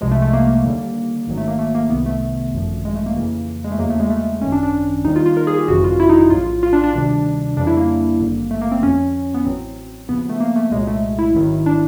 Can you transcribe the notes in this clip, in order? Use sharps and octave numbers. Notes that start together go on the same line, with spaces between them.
C2 C3 F3 G#3
A3
A3
A#3
D#2 D3 G3
A1 G#2 D#3 F#3
A3
A#3
A3
A#3
C2 C3 D#3 B3
A3
G#1 F#2 D3 F3
G#3
A3
A#3
F2 C#3 E3
G#3
A3
E2 C#3 F#3 A#3
A3
G#3
A3
G#1 F#2 D#3 C#4
D4
D4
D#2 D#3 G3 D#4
F4
F4
A#4
G#4
G4
G#1 F#2 C#3 E3 G3 F#4
F4
E4
D#4
E4
A#1 A2 F#3 F4
F4
D4
D4
D2 C3 D#3 G3
F2 C#3 E3 G3 D4
E4
A#3
G#1 G2 D3 G3
A3
A#3
C4
F2 D3 F3 C#4
B3
A1 A2 F#3 C4
D#2 C#3 F3 B3
A3
A#3
A3
C2 A#2 F#3 G#3
A3
E4
A1 G#2 D#3 F#3
D4